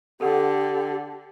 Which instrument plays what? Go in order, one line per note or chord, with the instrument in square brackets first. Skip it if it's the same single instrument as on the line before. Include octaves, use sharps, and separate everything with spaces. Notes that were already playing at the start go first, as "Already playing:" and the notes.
[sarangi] D3 [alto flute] G4 [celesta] A4 F#5